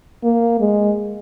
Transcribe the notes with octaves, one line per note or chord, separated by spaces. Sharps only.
A#3
G#3